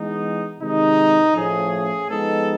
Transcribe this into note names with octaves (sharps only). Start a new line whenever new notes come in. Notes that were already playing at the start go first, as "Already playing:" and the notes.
Already playing: E3 G#3 B3 D#4
C3 D#3 G#3 D#4
A2 F3 A3 C#4 G#4
F3 G#3 B3 D#4 A4